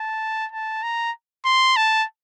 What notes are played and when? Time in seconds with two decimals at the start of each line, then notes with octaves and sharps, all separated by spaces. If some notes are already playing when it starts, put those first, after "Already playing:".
Already playing: A5
0.52 A5
0.83 A#5
1.45 C6
1.76 A5